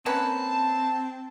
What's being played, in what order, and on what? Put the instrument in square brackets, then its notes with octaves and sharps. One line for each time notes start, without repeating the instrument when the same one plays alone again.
[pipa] A#3 C#4 B4 [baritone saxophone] C4 [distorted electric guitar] A5